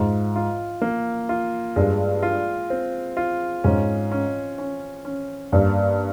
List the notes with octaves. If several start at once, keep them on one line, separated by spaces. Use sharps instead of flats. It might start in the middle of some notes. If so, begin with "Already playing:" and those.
Already playing: G#2 F4
F4
A#3
F4
G2 G#3
F4
C4
F4
G#2 C#4
C#4
C#4
C#4
G2 A#3